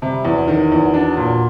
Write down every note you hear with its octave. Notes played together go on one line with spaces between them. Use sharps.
C3 G3
E2 F#3
D#3 F#3
E2 F#3
D4
A#2